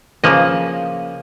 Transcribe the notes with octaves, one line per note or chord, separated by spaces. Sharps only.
C#3 F3 A#3 D#5